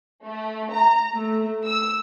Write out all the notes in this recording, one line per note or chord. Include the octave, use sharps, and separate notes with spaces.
A3
A#5
A3
E6